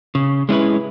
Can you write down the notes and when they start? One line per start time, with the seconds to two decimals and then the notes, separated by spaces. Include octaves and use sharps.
0.15 C#3
0.49 G#3 C#4 E4 B4